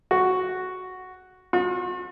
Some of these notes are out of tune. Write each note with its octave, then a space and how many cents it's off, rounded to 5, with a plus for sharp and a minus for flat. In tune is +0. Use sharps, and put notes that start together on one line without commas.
F#4 +0
F#4 -45